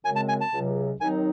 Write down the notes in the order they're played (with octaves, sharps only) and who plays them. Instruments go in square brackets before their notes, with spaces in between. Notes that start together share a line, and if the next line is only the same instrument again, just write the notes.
[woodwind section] F#2 C#3 G#3 C4 [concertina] G#5
[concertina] A5
G#5
A5
[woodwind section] C#2 C3 F#3
[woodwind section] D#2 D#3 F#3 C4 D#4 [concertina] G#5